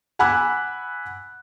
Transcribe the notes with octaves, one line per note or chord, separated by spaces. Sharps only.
F#5 G#5 B5 D6 E6 F#6